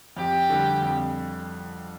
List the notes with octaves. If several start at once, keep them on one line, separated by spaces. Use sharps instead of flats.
F2 G4
D3 G3
F2